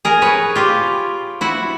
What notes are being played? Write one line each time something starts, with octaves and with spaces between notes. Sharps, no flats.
G#4 A#4
B4 C#5
F4 G4
E4 F#4